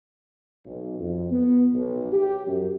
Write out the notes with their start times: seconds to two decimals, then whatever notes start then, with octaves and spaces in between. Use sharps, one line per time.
0.65 B1
0.99 F2
1.31 B3
1.74 B1
2.12 G4
2.47 F#2